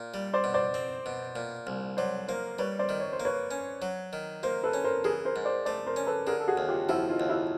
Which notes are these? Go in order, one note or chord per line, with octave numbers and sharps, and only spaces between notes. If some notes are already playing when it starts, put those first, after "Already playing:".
Already playing: A#2
G3
C5 D5
B2
C5 D5
C4
B2
A#2
C2
F#3 C5 D5
A#3 A#4 C5
G3 B4 C#5
C5 D5
D#3
C#5
C5
A#3
B4 C#5
C#4
F#3
D#3
A#3 A#4 C5
A4 B4
C#4
A#4 C5
E3 G#4 A#4
A#4 C5
G#2
C5 D5
A3 C5 D5
A#4 C5
C#4
A4 B4
D3 G#4 A#4
A4
F#4 G#4
D#2
F4 G4
F3 E4 F#4
D#4 F4
D#2
E4 F#4